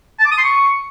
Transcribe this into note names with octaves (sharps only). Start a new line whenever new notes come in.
A5
D6
D#6
C6
C#6